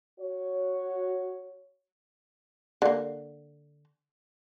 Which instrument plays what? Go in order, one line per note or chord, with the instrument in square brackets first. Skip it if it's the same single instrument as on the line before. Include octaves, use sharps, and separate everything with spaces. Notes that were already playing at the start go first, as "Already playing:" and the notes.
[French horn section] F#4 C#5
[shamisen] D3 A#3